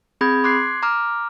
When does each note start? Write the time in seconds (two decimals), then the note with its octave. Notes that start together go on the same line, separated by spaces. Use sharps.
0.21 C4 G#4 B5 D#6 G6 G#6
0.44 C6 D6 F#6 G#6 C7
0.83 A#5 D6 F6